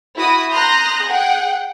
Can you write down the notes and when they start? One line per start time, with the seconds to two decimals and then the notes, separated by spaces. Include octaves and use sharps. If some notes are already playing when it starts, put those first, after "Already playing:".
0.17 E4 F#4 D#6
0.54 A#5 C6 D#6 F#6 G6 A#6
1.07 G#4 F#5 G5